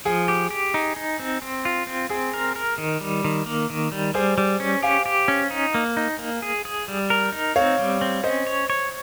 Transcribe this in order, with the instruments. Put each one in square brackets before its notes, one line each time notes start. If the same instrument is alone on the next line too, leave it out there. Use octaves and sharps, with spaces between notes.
[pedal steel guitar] F3 [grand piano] G#4
[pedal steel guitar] G4
G4
D#4
D#4
C4
C4
F4
C4
[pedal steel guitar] C4 [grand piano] G#4
[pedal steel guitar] A#4
A#4
D#3
G3
D#3
A#3
D#3
G3
[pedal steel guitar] G3 [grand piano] G#4 C5
[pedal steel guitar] G3
C#4
[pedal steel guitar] G4 [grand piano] F5 G#5
[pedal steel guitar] G4
C#4
D#4
A#3
D#4
A#3
G#4
G#4
G3
A#4
D#4
[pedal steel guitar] C4 [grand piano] C#5 F5
[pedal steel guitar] G3
C4
[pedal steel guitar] C#4 [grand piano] C5 D#5
[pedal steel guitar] C#5
C#5